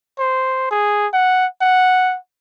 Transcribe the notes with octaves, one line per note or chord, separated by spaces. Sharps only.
C5
G#4
F#5
F#5